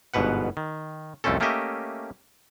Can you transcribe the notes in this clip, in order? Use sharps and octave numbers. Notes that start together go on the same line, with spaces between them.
G1 G#2 B2 B4 F#5
D#3
C2 F2 A3 C4 C#4 A4
A3 A#3 C#4 G4 D#5 E5